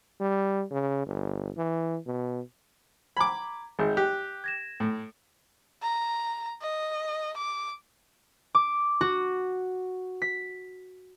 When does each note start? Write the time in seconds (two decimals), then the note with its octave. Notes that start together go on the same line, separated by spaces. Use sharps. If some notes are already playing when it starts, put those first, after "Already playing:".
0.21 G3
0.71 C#3
1.06 G1
1.57 E3
2.06 B2
3.17 A#5 B5 D6 G#6
3.79 G#1 G#4 E5 G6
3.97 G4 F#6
4.44 G#6 A#6 E7
4.80 A2
5.82 A#5
6.62 D#5
7.37 D6
8.55 D6
9.01 F#4
10.22 B6